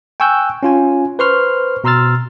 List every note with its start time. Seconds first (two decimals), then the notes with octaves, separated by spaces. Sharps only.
0.20 G5 G#5 C#6 E6 F#6 G6
0.63 C#4 F4 G#5
1.19 B4 C5 C6 C#6 F6
1.84 B2 A#5 C6 E6 F6 A6